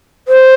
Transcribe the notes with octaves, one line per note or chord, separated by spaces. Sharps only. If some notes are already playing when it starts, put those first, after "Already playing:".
C5